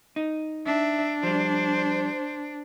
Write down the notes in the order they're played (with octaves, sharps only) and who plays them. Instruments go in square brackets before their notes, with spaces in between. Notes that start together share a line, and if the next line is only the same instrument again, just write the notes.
[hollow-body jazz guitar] D#4
[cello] D4 [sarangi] E5
[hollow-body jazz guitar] F3 G3 [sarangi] C5